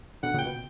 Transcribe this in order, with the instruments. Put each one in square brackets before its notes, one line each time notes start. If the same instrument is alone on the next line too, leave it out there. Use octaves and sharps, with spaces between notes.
[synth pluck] B2 D3 [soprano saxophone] F#5
[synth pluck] A#2 C#3
[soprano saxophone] G5
[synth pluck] B2